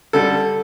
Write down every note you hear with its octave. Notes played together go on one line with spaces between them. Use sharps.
D3 G3 A4